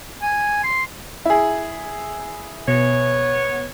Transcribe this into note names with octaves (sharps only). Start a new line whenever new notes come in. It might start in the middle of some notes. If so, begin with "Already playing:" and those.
G#5
C6
E4 G#4
B2 B3 C#5